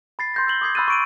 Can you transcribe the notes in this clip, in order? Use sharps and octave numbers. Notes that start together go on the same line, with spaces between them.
B5 A6 C7
C6 G6 A#6
E6 G6 F#7 G7
D6 D#6 G#6 C7
B5 C6 E6 F#6 A6 D#7
C#6 D7 D#7